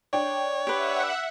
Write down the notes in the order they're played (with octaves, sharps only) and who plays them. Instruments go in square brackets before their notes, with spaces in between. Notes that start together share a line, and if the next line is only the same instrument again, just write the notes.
[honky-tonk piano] D4 G5 [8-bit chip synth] C#5
[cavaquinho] G4 B4 [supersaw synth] E5 F#5